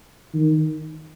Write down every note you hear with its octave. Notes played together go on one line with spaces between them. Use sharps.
D#3